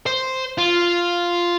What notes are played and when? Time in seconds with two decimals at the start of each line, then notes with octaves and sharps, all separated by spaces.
0.06 C5
0.58 F4